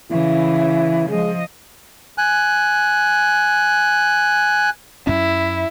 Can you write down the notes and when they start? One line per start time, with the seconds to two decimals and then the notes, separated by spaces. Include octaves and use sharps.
0.11 C#3 E3 E4
1.09 F3 G#3 D#5
2.18 G#5 F#6
5.07 F#2 C#4 E4